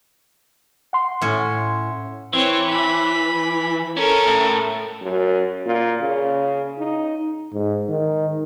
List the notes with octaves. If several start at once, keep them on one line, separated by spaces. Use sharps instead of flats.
F#5 C6
A2 C#4
E3 C4 C#5
B5
C#4 A4 A#4
A2
F#2
A#2
C#3
D#4
G#2
D#3